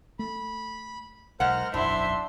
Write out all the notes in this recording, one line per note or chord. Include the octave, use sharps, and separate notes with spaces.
A3 B5
B1 G#3 A#4 C5 F#5 F6
E1 B1 F#2 D4 E4 C5 E5 C6